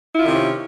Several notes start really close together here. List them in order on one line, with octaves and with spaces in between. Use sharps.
E4 F4 D#3 C3 C#4